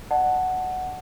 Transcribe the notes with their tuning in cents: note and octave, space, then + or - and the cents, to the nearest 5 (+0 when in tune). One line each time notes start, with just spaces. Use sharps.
D5 +45 F#5 +0 A5 +0